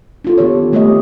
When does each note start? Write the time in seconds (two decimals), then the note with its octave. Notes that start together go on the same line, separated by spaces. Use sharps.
0.25 D4 F4 A4
0.38 D#3 B3 G4 C#5
0.72 G3 A3 C4 G4 C#5 D#5